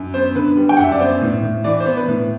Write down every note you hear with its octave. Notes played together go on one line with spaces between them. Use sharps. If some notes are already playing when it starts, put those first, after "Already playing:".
Already playing: F#2
B3 C5
D3 B4
G3
G5
F#2 F#5
E5
D5
B3 C5
A2
A2
E3 D5
C5
B3
B4
A2